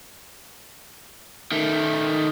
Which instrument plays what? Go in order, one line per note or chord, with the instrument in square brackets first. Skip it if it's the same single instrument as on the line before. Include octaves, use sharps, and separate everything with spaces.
[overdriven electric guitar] D#3 A3